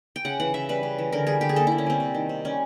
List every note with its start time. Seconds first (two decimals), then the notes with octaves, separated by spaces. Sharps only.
0.16 G5
0.25 C#3 F#5
0.40 E3 F#5
0.54 C#3 E5
0.69 G3 B4
0.83 C#3
0.99 E3
1.12 D3 A#4
1.27 G3 G#4
1.41 D3 G4
1.49 G#4
1.56 A#3 A4
1.67 D3 E4
1.78 C#4
1.86 G3 C4
2.00 C3
2.15 D#3
2.29 C3
2.45 G3 C#4